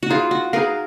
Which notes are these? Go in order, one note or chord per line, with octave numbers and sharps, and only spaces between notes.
F#4
D#4 F4 G#4 B4 F5
F#4
D#4 G#4 A#4 B4 F5